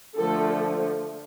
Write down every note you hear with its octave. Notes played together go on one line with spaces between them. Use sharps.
D3 F3 A3 A4